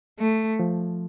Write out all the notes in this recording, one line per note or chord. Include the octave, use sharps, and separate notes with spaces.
A3
F3